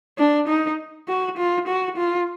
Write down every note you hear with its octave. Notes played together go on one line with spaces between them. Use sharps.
D4
D#4
F#4
F4
F#4
F4